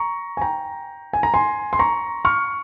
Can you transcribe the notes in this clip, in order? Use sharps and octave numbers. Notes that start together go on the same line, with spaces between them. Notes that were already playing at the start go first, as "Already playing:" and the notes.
Already playing: A#5 C#6
G#5
G5 A#5
G#5
A#5
G#5 C6
C6
A#5 C#6
C#6 F6